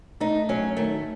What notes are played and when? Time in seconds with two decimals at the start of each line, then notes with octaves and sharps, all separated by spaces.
0.20 A3 D#4
0.49 F#3 C#4
0.77 D#3 A3